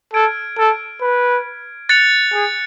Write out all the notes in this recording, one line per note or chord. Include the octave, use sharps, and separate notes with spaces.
A4 F6 G#6 D7
A4
B4
F#6 A6 C#7 F7
G#4